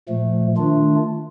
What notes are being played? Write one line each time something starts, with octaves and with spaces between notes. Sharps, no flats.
A#2 F3 A3
D#3 A3 D4 F4